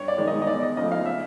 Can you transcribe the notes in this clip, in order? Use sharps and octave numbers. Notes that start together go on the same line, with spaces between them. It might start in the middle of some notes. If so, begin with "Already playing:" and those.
Already playing: G2 C#5
D5
D#3 G#3
D#5
D#5
E2 D5
D#5
C#3 F3 A3 D#5
F5
E5